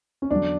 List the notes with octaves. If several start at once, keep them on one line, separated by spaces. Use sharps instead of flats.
C#4
E2 D3 F#3 D4